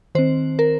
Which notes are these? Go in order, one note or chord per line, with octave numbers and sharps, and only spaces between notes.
D#3 C4 C5
A#4